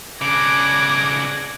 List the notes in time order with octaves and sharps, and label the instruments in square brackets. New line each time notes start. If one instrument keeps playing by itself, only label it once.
[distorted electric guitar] C#3 D4 [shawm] D6 [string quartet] F#6 G#6 A#6